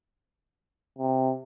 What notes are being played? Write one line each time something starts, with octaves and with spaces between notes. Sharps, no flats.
C3